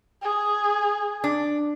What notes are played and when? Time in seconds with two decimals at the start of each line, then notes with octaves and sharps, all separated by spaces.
0.22 G#4
1.24 D4